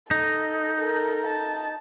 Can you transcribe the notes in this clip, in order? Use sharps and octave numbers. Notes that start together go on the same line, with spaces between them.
D#4 A4
A4 A#4
A5